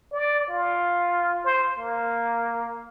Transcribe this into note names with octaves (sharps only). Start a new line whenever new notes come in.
D5
F4
C5
A#3